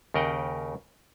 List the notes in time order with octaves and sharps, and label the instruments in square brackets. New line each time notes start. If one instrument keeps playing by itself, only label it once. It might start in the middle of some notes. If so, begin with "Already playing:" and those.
[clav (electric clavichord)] D#2 C#3 A#4 D#5 F#5 G5